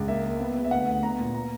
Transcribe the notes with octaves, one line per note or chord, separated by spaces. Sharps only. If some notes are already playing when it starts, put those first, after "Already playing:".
Already playing: C#2
A#3 E5
A#3
B3
B3
E5
D2 F#5
D2
B3 A#5
A#2
A#5